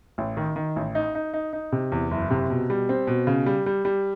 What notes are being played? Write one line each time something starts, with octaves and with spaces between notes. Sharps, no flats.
A1
D#3
D#3
A1
D#4
D#4
D#4
D#4
C3
E2
F#1
C3
B2
G3
C4
B2
C#3
G3
G3
G3